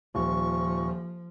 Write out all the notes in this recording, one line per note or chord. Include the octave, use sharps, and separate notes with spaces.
D#1 F3 C#6